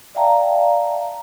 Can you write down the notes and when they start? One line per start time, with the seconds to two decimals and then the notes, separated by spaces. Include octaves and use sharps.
0.15 D5 E5 F5 G5 A5 A#5